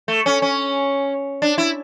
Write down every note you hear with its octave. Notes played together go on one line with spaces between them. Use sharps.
A3
C#4
C#4
D4
E4